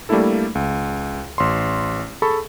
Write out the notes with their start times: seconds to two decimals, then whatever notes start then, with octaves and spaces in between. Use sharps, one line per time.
0.09 G3 A3 A#3 D4 E4 A4
0.55 C#2
1.38 A1 C6
2.22 G#4 A4 A5 B5 C#6